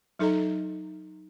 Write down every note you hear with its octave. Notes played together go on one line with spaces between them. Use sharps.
F#3 D#4 A4 D#5 A#5